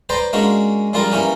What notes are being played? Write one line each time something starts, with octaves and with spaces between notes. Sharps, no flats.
B4 C5 D5 G5 A#5
G#3 A#3 C#4 D4 F#4
C#3 F3 G3 F4 A#4
E3 A#3 C#4 G4